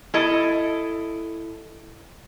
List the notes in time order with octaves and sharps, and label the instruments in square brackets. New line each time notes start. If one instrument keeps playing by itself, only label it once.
[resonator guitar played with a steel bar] E4 A4 D#5